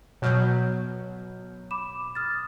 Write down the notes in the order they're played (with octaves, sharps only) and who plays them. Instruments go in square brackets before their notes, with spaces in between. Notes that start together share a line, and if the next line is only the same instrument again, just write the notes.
[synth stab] B2 F#3 [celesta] C#5 F6 G6
[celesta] B5 D6 E7
D#6 F6 A6